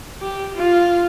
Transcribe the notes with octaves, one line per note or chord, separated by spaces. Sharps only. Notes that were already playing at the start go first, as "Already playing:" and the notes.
G4
F4